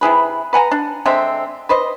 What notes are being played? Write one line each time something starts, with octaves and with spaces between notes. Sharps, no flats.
C3 E4 G#4 B4
B4 F#5 G#5 A#5
D4
D3 G#3 C4 E5
B4 C5 D#5